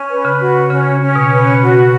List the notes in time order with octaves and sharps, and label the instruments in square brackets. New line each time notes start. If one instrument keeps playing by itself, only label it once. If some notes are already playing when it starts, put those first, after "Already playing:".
Already playing: [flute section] C#4
B4
[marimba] C#3
[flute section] F#4
[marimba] C#3 [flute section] C#4
[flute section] C#4
[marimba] B2
[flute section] B4
F#4